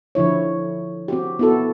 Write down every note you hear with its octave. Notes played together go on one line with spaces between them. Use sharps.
D3 F3 E4 C#5
C4 F#4 G4
B3 E4 F#4 A4